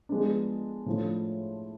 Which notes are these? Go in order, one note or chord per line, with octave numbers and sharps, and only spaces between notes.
F3 G#3 B3 D4
A2 F3 A3 D4